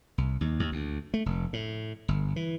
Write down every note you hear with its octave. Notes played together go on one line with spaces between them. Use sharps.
C2
D#2
D#2
D2
A3
F1
A2
G1
E3